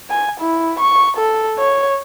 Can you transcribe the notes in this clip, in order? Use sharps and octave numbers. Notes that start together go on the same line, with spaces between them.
G#5
E4
C#6
A4
C#5